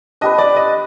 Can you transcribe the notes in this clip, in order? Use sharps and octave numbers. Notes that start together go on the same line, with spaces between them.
D4 G4 B4 D#5
D5
D#5